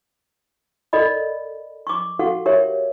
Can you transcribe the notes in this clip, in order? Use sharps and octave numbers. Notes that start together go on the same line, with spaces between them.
A4 A#4 D5 D#5 B5
C#6 D6
F#4 G4 A4 F5 F#5 C#6
G4 A#4 C#5 E5